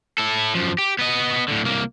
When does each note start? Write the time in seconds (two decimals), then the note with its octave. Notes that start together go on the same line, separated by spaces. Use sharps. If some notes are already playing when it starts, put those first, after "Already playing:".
0.18 E4 A4
0.55 F#2 F3
0.78 G4
0.99 B3 D#5
1.48 A2 D3
1.64 C2 A#3